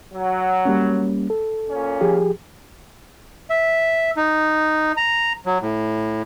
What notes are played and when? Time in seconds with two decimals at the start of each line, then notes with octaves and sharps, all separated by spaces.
0.13 F#3
0.65 G3 A#3 C#4
1.30 A4
1.69 A#2 C#4
2.01 F3 G4 G#4
3.50 E5
4.17 D#4
4.97 A#5
5.46 F#3
5.62 A2